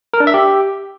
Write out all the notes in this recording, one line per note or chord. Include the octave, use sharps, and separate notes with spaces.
A#4
D4
E5
G4